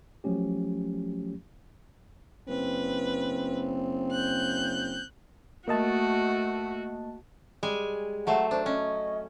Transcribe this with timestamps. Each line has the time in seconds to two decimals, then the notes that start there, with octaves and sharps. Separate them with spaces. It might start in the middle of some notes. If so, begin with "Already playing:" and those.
0.24 F3 F#3 A3 C#4 G4
2.49 F#1 C4 B4
4.11 F#6 G6
5.68 A3 A#3 F#4 D#5 A5
7.63 G3 G#3 G#5
8.27 F#3 A3 C5 F#5
8.51 D4 C5
8.66 C#4 D#5